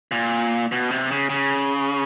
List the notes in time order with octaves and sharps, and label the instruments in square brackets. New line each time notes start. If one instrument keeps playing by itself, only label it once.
[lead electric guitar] A#2
B2
C3
C#3
C#3